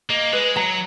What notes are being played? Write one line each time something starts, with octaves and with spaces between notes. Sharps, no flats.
A#3 D#5
G#3 B4
F#3 A#5